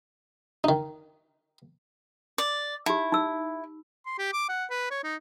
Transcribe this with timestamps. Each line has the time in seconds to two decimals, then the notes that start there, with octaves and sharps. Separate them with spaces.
0.64 D#3 D#4
2.38 D5
2.86 D#4 E4 G4
3.12 D#4 E6
4.06 C6
4.18 G4
4.33 D6
4.49 F#5
4.70 B4
4.91 C#5
5.04 D#4